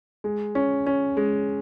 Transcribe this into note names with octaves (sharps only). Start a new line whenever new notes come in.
G#3
C#4
C#4
G#3